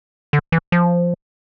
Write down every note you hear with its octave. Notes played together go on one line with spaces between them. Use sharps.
D3
E3
F3